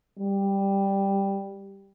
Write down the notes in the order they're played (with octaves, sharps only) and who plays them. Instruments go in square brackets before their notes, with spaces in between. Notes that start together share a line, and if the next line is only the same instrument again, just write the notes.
[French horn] G3